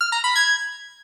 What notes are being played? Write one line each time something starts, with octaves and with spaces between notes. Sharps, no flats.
F6
A#5
B5
G#6